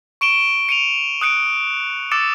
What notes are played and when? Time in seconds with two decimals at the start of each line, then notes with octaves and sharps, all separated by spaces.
0.21 C#6 D7 E7 G7
0.69 C#7 D#7 F7
1.21 D#6 F#6 C#7 D7
2.12 D6 E6 A6 C#7 E7